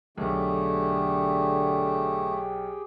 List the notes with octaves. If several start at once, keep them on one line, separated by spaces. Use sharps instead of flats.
B1 D3 A3 G4 G#4 G5